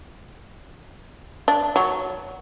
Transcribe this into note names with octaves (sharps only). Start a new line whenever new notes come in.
D4
F#3